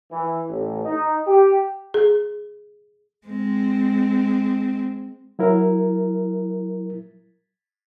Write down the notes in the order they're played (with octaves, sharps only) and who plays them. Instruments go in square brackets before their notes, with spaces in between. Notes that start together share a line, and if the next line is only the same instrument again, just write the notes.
[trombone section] E3
A1
D#4
G4
[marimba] G#4
[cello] G#3 C4
[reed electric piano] F#3 E4 A#4